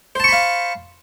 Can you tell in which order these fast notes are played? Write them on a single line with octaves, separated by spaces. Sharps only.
C5 A5 C#6 B5 F5